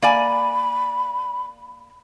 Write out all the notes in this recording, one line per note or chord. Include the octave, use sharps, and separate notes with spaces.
A#3 D5 G#5 B5